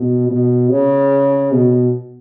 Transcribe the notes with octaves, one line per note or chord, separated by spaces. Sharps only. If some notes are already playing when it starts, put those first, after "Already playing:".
Already playing: B2
B2
C#3
B2